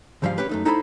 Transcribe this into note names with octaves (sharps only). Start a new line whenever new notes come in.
D2 G#2 F3 G3 G#3 F5
C#4 G4 B4
F#2 A3 D#4
D#4 E4 A4 C5 A5 B5